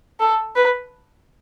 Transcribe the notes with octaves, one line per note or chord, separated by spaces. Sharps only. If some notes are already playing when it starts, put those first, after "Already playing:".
A4
B4